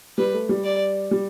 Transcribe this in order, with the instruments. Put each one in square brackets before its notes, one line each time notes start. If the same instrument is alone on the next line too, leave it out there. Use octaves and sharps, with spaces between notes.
[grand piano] G3 [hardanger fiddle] B4
[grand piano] A3
G3
[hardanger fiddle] D5
[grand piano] G3